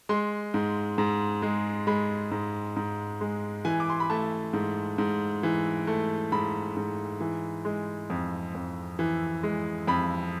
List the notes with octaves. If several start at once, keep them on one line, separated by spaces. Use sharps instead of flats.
G#3 C6
G#2
G#2
G#3
G#3 B5
G#2
G#2
G#3
E3 G#5
D6
C6
B5
A3 A5
G#2
G#2
E3
A3
G#2 B5
G#2
E3
G#3
F2
F2
E3
G#3
F2 B5